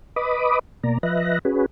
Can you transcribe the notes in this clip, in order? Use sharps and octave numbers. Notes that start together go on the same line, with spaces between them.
B4 D#5 B5 D6 D#6
B2 A#3 D5 A#5
F3 B4 D#5 E5 F#6 A#6
C#4 F#4 G#4 B4